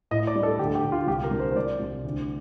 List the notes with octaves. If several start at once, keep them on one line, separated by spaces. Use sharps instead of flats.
A2 D#5
D5
G3
A4
D2 G4
G4
D2
F4
C2 G4
A#4
C2
C5
C5
C2 D5
C2
D2